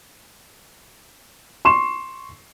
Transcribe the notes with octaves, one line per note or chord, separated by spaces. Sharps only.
C6 C#6 E7